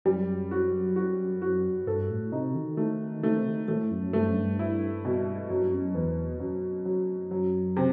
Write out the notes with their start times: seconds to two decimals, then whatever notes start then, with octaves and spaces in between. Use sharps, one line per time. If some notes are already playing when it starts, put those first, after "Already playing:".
0.05 F#2 G3
0.51 F#4
0.96 F#4
1.42 F#4
1.87 G2 A4
2.10 A2
2.32 C3 D#4
2.55 D#3
2.77 D#3 A3
3.23 D#3 A3
3.36 C3
3.48 D#3
3.68 A2 A3
3.91 F#2
4.02 F#2
4.13 G2 A3
4.27 F#2
4.36 G2
4.59 E4
5.05 B2
5.50 F#2 F#3
5.61 G2
5.72 F#2
5.94 E2 B3
6.40 F#2 F#3
6.85 F#3
7.31 F#3
7.76 C3